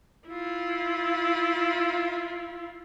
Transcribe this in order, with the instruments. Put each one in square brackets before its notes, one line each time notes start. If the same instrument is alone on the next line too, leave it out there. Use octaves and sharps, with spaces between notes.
[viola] E4 F4